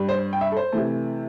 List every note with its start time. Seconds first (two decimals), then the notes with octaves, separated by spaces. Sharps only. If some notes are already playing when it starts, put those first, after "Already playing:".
Already playing: G2 G3
0.09 C5
0.33 G5
0.41 E5
0.52 A4
0.57 C5
0.72 C3 E3 A3